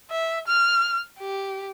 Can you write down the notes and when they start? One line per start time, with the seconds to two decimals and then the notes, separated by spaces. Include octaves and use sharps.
0.11 E5
0.48 F6
1.19 G4